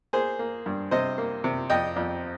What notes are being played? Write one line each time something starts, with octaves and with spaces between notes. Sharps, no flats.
A#3 G#4 C5
A#3
G2
C3 C5 D#5
A#3
C3
F2 D#5 G5
F2